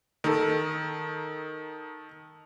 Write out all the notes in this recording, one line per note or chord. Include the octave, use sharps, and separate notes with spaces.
D#3 D#4 A4